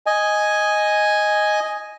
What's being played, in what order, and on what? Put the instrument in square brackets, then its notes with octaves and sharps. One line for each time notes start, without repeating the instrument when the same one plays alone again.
[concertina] D#5 G#5